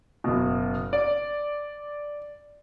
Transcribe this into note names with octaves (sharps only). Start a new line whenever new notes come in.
F#1 B2
D5